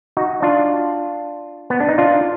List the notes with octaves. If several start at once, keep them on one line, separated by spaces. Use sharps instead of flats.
D#4 F#4
D4 F4
B3
D4
D#4
D4 F4